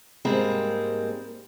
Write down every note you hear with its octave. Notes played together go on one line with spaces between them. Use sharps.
G#2 G3 G#3 A#3 C4